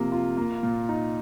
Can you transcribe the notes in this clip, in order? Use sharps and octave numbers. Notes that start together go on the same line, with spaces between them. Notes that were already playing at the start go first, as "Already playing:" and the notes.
Already playing: C3 F3 A#3
F4
A#3
A#2
D#4